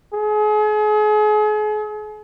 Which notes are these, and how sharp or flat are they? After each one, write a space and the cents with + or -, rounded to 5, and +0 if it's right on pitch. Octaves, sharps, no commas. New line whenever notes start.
G#4 +35